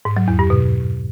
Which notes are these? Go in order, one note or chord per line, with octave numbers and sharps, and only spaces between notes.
G#2
F#3
E2
G2
B2